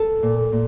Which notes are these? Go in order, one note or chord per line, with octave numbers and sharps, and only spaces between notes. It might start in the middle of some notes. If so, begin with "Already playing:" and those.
Already playing: A4
A#2
A#2